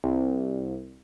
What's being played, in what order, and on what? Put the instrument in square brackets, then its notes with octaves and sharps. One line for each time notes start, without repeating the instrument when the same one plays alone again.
[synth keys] C2